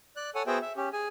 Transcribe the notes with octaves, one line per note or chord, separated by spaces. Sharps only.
D5 F#6
A4 C#5 F#5 G#5
B3 F#4 G#4 C5 E5 G5
E5
C#4 G4
G#4 G#5